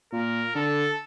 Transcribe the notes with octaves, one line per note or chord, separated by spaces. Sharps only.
A#2 A#4
D3 A4